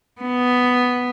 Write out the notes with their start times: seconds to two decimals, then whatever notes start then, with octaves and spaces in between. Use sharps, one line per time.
0.21 B3